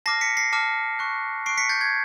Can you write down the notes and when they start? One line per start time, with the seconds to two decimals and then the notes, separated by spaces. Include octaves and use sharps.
0.06 A5 D6 F6 A#6 C7
0.21 B6 C#7
0.37 A#6 C7
0.53 A5 D6 F6
0.99 C#6 F#6
1.46 C#6 F#6 C7 D7
1.58 B6 C#7
1.69 G6 A6
1.81 G#6